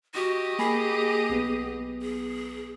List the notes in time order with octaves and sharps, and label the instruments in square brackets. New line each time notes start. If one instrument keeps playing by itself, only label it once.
[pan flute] F#4 [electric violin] G4 D#5
[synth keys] A#3 G#5 B5 [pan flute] G#4
[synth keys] B1 B3
[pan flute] G#4